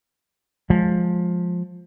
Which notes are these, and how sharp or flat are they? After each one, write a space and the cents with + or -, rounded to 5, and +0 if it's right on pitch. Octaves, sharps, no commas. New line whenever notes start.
F3 +15 G#3 +5